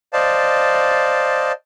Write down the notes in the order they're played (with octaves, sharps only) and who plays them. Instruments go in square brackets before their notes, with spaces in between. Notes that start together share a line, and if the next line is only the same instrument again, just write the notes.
[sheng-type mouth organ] C5 D5 D#5 F5 A5